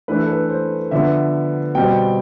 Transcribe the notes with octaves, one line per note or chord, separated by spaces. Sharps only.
E3 A3 D4 B4
A4
B4
C5
D3 F3 B3 E5
B2 G3 C4 G5